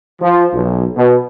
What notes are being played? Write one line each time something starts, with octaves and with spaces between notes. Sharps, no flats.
F3
B1
B2